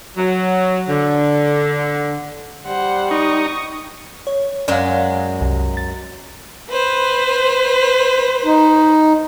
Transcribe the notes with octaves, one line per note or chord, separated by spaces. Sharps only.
F#3
D3
G3 C5 F#5
D#4 C#6 D#6
C#5
F#2 F#3 G#3 D5 F5
C2
A6
B4 C5
D#4